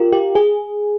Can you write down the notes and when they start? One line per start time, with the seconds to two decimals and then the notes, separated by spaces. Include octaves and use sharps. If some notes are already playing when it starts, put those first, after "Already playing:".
Already playing: F4 G4 A#4
0.12 G4
0.35 G#4